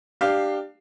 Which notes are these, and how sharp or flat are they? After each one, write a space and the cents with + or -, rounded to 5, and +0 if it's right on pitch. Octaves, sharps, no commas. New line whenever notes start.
D4 +25 G4 +0 F5 +0